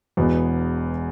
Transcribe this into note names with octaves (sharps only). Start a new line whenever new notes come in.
E1 E2 B2 B3